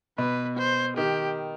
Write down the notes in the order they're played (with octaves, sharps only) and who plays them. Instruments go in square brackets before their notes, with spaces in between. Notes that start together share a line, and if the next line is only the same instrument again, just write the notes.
[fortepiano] B2 [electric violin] B4
[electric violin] C5
[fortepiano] D#3 [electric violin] G4